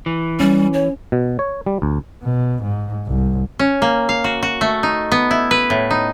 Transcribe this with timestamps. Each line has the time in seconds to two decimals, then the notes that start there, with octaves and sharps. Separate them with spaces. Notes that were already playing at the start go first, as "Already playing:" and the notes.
0.06 E3
0.40 G3 C#4
0.73 C#5
1.12 B2
1.39 C#5
1.66 G3
1.82 D2
2.23 B2
2.62 G#2
3.06 C2
3.59 C#4
3.82 A#3
4.09 F5
4.24 F#4
4.43 F#4
4.61 A3
4.83 D#4
5.12 B3
5.31 E4
5.51 B4
5.70 A2
5.91 D#4